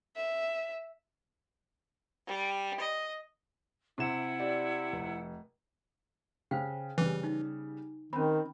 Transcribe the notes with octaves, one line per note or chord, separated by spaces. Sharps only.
E5
G3
D#5
C3 E4 F#5 E7
G4 D5
F1
C#3 C5 F5 G5
C#3 E3 G3
D#4
D#3 C4 C#4 B5